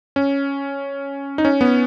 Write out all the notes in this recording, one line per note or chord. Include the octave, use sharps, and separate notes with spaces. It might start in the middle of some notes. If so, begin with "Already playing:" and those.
C#4
D#4
C#4
B3